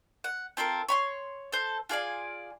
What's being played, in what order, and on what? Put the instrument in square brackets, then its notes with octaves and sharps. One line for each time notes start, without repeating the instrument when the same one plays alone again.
[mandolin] F#5
C4 F4 A4 A#4
C#5 B5 C6
A4 C5
F4 G#4 D5 G#5